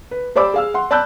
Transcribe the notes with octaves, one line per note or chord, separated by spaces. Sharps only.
B4
G4 C5 D5 B5 D6 E6
G#4 F5 E6
F#5 C6
D5 A5 B5 E6 F#6 G6